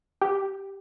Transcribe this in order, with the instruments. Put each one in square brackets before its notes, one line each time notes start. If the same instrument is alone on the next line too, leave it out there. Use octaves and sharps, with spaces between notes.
[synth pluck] G4